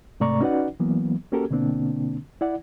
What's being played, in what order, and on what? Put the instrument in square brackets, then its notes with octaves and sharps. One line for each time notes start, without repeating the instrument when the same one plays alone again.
[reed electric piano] G#2 C3 A3 D5 A#5 C#6
C#4 D#4 F#4 B4 D5 F#5
E3 F#3 A#3 B3
A#3 C#4 F#4 G4 A4 A#4
B2 D3 A#3 C4 D4
E4 D5 F#5